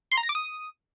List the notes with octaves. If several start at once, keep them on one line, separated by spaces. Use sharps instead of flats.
C6
A#5
A#6
D6
D#6